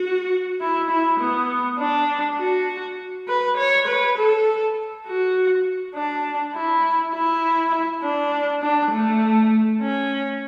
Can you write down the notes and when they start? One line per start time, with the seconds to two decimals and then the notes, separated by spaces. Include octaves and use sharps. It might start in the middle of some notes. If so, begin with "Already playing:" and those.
Already playing: F#4
0.61 E4
0.90 E4
1.20 B3
1.79 D4
2.39 F#4
3.28 B4
3.57 C#5
3.88 B4
4.18 A4
5.07 F#4
5.95 D4
6.55 E4
7.14 E4
8.03 D4
8.62 D4
8.91 A3
9.81 C#4